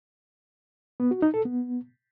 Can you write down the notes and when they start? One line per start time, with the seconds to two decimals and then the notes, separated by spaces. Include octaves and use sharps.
1.00 B3
1.11 F#4
1.22 D#4
1.34 A4
1.45 B3